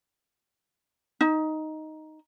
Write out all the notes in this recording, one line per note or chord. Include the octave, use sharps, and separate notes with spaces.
D#4